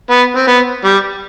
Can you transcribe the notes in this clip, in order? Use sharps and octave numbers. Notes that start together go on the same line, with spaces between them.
B3
C4
B3
G3